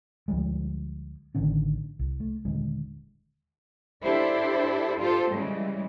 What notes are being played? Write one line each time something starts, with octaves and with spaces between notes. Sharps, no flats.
D2 F3 G3 G#3
A1 D3 D#3 C#4
C2
A3
D#1 D3 G#3
D4 E4 G4 A4 C5 D5
F4 G4 A4 C5
C#3 E3 G3 G#3